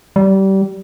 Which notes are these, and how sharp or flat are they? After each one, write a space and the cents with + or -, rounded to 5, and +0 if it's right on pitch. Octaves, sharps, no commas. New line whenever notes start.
G3 -25